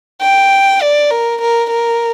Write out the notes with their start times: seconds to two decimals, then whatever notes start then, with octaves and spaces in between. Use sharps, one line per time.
0.22 G5
0.82 D5
1.11 A#4
1.41 A#4
1.71 A#4